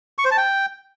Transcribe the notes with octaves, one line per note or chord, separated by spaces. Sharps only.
C#6
C5
A5
G5